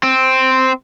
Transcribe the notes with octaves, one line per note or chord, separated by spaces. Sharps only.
C4